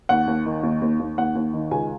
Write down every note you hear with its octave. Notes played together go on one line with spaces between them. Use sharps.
D#2 F#5
D#2
D#3
D#2
D#2
D#2
D#2 F#5
D#2
D#3
C#2 G#5